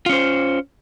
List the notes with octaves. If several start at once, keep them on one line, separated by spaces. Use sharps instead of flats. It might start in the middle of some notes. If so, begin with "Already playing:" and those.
C#4 F4 C5